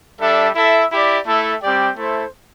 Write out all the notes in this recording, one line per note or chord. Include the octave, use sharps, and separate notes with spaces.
G3 D4 A4 E5
E4 A4 E5
E4 G4 D5
A3 E4 A4 E5
G3 C4 G4 D5 G5
A3 E4 A4 C5